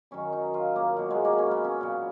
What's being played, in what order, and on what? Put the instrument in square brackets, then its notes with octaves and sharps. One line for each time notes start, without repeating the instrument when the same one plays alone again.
[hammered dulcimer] F#2 D#3 F#3 C#4
D#4
F4
A#3
B2 F#3
G#3
A#3
C#4
B3
C#4
A#2 F#3